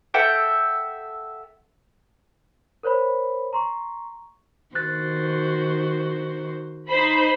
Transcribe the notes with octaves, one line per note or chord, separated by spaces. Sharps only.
A4 E5 F#5 G5
A#4 C5 C#5 B5
A#5 C6 C#6
D#3 F#4 C5 F#6 A6
D#4 C5 B5